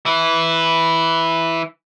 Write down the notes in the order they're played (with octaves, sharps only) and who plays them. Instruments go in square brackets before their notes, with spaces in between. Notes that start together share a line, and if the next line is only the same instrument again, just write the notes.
[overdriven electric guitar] E3 E4